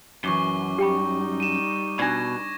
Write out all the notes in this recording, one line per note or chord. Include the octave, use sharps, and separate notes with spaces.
F#2 E3 C#6 D6 G7
G3 D#4 G4 G5 B5
D#7 E7
B2 D4 D5 G#6 A#6